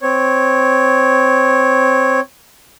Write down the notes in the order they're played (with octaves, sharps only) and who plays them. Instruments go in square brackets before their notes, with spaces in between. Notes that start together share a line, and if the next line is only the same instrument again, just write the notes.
[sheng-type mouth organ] C4 C#5